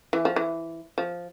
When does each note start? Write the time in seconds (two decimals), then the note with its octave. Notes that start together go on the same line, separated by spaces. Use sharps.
0.13 E3
0.25 F3
0.36 E3
0.98 F3